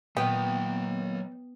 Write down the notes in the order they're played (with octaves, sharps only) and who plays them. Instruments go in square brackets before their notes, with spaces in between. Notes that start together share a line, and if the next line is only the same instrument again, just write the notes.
[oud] A#2 D#3 [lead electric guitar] F#3 D#5 [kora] B3 [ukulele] G5